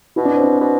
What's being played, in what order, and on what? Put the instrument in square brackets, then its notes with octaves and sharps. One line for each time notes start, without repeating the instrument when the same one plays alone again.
[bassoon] B2 [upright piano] E4
[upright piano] D4
C4
D4
[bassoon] B2